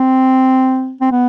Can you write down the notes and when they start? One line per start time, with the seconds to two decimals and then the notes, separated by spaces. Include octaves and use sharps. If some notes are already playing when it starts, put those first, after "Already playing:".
Already playing: C4
1.01 C4
1.11 B3